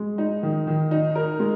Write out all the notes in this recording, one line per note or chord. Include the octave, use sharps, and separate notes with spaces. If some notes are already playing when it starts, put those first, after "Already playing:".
Already playing: G#3
D#4
D#3
D#3
D#4
A#4
G#3